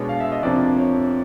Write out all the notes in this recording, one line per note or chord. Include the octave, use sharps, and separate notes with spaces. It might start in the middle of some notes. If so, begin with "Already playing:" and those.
Already playing: B2 G#3 B3 D4 C#5
F5
E5
D#5
F2 C3 F3 A#3 D4 D5
C#5